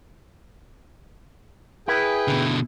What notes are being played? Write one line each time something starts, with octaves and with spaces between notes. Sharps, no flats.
E4 G#4 B4 G5
B2 D3